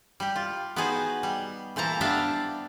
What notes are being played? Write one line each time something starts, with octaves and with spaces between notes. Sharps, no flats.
G3 G4
F4
B3 D#4 F#4 G#4 B4 C5
G3
A#2 E3 C5 A5 A#5
B3 D4 G4 C5 E5 F5